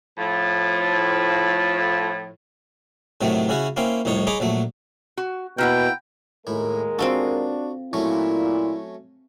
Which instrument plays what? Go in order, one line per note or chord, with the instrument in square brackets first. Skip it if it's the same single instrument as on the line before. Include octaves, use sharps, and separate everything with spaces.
[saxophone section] A2 F3
[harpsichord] A2 C3 D#3 F#3 A3
C#3 C#4 E4 F#4
A#3 C#4 E4 C5 G5
C2 F2 A2 D#4 C#5
D#4 G#4 C#5 A#5 B5 D6
A#1 F#3 A3
[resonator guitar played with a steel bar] F#4
[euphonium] B2 [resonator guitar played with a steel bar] A#3 E4 F#5 [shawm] G5
[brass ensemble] D#2 G#3 A#4 [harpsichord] A2 E4
[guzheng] C4 F4 A4 [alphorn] D4 [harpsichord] F#4
[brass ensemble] A#2 [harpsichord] F#3 A3 C#4 [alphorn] E4